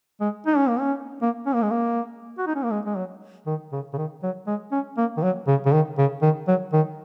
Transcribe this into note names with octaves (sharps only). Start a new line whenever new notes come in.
G#3
D#4
C#4
A#3
C#4
A#3
C#4
A#3
G#3
A#3
F#4
D#4
C#4
A#3
G#3
G#3
F#3
D#3
C#3
C#3
D#3
F#3
G#3
C#4
A#3
D#3
F#3
C#3
C#3
D#3
C#3
D#3
F#3
D#3